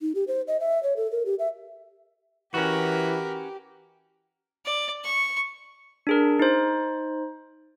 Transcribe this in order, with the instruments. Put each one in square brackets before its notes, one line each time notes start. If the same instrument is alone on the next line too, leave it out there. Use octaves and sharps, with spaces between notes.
[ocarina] D#4
G4
C5
D#5
E5
C#5
A4
A#4
G4
E5
[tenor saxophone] E3 [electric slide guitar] C#4 F#4 [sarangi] G4 [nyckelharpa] A#4 B4
[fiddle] D5
C#6
[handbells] D4 G#4 A#4
D#4 C5